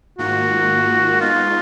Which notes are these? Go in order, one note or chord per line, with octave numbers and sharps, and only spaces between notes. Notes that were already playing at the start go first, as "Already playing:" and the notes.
G#2 D#3 A#3 F4 F#4
G#3 B3 D#4 F4